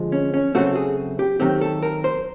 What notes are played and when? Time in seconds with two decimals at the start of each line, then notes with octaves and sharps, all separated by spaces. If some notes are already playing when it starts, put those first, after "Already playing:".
Already playing: D3 F3 G#3
0.12 C#4
0.34 C#4
0.55 C#3 F#3 A3 C4 F#4
0.76 G#4
1.19 G4
1.40 D#3 F#3 A3 C4 G4
1.61 A4
1.83 A#4
2.04 C5